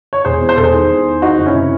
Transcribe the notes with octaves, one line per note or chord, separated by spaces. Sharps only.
C#5
E1 G#4 C5
E2
C5
E1 A4
G#4 C5
D#3
E2
D#3
D#3 D#4 F#4
F#1
C#4 E4
C3